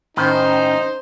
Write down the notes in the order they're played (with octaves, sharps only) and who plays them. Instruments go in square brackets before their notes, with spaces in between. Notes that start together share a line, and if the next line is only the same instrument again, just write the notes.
[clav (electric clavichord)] A2 D#3 [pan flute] C#4 [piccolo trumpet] D#4 [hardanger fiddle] C5